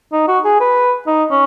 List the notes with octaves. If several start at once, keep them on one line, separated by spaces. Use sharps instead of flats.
D#4
F#4
G#4
B4
D#4
C#4